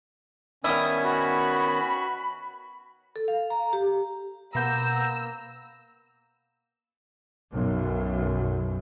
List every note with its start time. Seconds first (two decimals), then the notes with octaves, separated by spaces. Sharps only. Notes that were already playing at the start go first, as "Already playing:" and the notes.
0.64 D#3 G3 B3 C#4 E4 D#6
1.03 F#4 B5
3.16 A4
3.28 F5
3.50 A#5
3.73 G4
4.55 B2 A#3 B3 A#5 E6 G6
7.53 B1 F#2